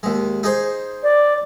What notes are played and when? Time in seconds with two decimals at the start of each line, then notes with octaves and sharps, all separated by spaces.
0.03 D#2 G#3
0.43 D#4 G#4 C5
1.03 D5